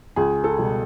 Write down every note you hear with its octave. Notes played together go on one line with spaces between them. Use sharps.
C#2 G#4
A4
B2 G3